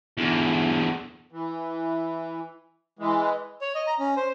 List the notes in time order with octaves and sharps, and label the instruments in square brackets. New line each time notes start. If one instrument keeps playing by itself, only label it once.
[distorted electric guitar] E2 D3
[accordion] E3
E3 G#3
[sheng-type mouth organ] C#5
D#5
A#5
C#4
C5